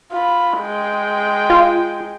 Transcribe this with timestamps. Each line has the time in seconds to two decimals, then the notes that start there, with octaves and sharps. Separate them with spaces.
0.13 F4 B5
0.60 G#3 G5
1.50 F4